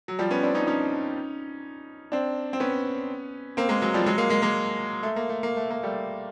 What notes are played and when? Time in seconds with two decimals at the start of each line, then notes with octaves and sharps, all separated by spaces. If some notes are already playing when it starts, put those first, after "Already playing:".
0.08 F#3
0.19 F3 G3
0.31 B3 C#4
0.43 C4 D4
0.55 C#4 D#4
0.67 C#4 D#4
2.12 C4 D4
2.53 C4
2.60 B3 C#4
3.57 A#3 C4
3.69 G#3 A#3
3.82 F#3 G#3
3.94 F3 G3
4.06 F#3 G#3
4.18 G#3 A#3
4.30 G#3 A#3
4.42 G#3 A#3
5.03 A3
5.16 A#3
5.29 A3
5.43 A#3
5.57 A3
5.70 A#3
5.83 G3 A3